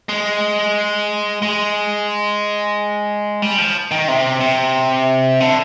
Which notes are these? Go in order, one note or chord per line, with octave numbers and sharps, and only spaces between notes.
G#3
G#3
G3
F3
D#3
C3
C3
D3